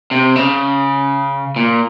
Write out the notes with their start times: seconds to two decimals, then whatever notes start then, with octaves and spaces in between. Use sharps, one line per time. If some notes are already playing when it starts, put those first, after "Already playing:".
0.11 C3
0.36 C#3
1.56 A#2